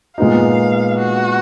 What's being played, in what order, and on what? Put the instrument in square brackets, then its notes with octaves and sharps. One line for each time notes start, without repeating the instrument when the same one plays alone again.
[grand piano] A#2 G#3 B3 D#4 [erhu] F5
[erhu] F#4